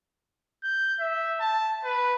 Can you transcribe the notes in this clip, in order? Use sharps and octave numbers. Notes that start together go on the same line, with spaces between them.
G6
E5
A5
B4